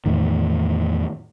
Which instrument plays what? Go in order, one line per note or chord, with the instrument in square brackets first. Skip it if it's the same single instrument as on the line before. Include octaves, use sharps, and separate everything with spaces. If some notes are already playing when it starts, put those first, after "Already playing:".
[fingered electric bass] E2 A2 D#3